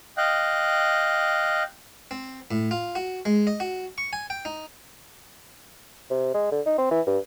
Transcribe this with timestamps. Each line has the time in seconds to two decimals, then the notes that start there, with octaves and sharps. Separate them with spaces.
0.17 D#5 F5 G5 F#6
2.11 C4
2.51 A2
2.71 F4
2.95 F#4
3.25 G#3
3.47 D#5
3.60 F#4
3.98 C#6
4.13 G#5
4.30 G5
4.45 D#4
6.10 C3
6.34 G#3
6.51 D3
6.66 D#4
6.78 C4
6.91 E3
7.06 G2